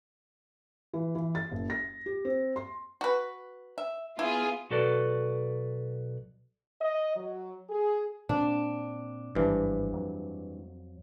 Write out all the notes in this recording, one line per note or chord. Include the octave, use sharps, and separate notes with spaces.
E3
E3
A6
F#1
A#6
G4
C4
C6
F#4 B4
E5
B3 E4 F4 G#4
B1 F#4 A4 B4 D5
D#5
F#3
G#4
A#2 C4 D4
G#1 G2 E3 F3
F2 F#3